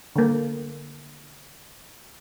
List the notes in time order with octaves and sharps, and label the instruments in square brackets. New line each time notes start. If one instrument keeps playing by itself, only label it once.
[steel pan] D3 A#3